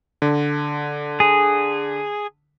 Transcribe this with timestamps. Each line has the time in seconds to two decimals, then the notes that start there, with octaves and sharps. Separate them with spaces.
0.22 D3
1.20 G#4